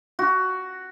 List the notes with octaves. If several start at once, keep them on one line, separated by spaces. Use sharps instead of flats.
F#4